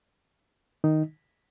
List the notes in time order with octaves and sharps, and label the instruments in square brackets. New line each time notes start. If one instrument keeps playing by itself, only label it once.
[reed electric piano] D#3 D#4